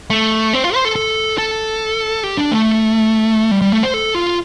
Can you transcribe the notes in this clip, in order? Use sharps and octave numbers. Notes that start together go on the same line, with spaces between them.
A3
C4
F4
C5
A4
A4
A4
G4
D4
A3
G3
G3
A3
C5
A4
F4